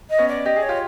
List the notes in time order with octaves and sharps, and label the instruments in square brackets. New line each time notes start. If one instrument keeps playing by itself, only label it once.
[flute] D#5
[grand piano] B3 C#4
[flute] D5
[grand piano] G4 [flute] D#5
[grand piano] G#4
[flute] C#5
[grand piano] F4 G4